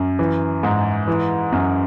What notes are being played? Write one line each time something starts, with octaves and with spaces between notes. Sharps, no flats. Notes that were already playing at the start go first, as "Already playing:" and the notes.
Already playing: F#2
E3
G#2
E3
F#2